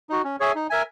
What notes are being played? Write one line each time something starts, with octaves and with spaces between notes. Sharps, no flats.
D#4 F#4
C#4
G#4 C#5 E5 G#5
D#4
A#4 E5 G#5